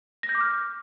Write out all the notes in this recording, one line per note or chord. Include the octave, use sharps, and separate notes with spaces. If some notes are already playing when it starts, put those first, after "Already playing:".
A#6
G6
D6
F6